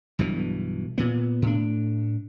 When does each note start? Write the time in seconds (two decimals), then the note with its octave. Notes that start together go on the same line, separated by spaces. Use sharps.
0.19 B1 G2 B2 E3
0.98 A#2 B3
1.42 A2 D4